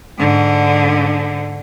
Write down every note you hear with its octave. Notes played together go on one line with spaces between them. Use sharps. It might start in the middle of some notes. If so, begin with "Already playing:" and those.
G#2 D3